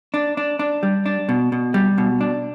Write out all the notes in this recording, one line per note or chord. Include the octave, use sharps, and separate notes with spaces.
D4
D4
D4
G3
D4
B2
B2
G3
B2
D4